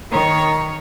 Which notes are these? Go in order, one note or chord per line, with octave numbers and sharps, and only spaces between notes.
D#3 C#5 A#5